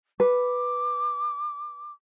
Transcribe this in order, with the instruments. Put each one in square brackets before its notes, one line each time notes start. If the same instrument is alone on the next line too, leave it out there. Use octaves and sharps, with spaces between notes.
[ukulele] B4 [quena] D6